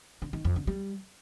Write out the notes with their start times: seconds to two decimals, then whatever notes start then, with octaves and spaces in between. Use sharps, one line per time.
0.22 D3
0.33 D#3
0.45 F2
0.56 D3
0.67 G3